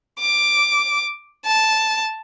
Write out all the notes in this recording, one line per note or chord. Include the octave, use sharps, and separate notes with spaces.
D6
A5